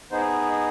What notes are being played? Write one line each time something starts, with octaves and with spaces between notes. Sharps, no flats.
B3 D#4 G#4 C5